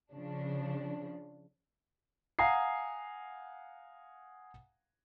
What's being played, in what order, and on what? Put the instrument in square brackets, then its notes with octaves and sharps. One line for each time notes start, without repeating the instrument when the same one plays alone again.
[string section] C#3 F3 D4
[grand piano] F5 F#5 G#5 A#5 D#6 C7